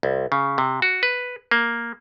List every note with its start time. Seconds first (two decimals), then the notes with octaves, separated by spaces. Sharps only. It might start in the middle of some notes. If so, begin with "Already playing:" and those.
0.03 C2
0.32 C#3
0.58 C3
0.82 F#4
1.03 B4
1.51 A#3